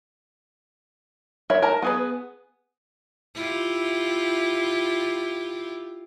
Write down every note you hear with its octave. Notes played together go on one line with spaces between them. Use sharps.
A#4 C#5 E5 B5
A#4 A5 A#5
B3 G#4 B4
E4 F4 G4